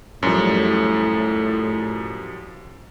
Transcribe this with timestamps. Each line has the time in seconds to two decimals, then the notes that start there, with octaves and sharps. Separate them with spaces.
0.23 F#2 A2 F3 G3